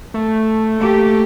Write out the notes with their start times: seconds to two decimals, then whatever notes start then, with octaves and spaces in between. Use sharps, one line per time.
0.14 A3
0.77 A#3 G4